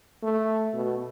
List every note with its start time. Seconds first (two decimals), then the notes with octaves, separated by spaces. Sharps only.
0.23 A3
0.74 B2